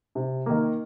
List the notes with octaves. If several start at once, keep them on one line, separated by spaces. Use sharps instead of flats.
C3
D#3 A#3